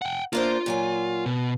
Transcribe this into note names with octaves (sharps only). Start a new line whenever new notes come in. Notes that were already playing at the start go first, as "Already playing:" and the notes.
F#5 G5
A#3 D4 F4 C5
A#2 F#3 G#5
B2